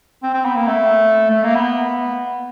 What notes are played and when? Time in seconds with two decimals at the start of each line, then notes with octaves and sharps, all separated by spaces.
0.23 C4
0.34 C4
0.45 B3
0.56 A#3
0.67 A3
1.30 A3
1.43 A#3
1.55 B3